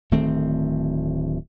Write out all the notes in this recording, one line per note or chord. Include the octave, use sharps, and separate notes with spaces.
D1 D#3 A3 C4